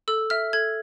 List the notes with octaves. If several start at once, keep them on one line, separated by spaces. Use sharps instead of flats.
A4 E6
E5 F6
A4 G#6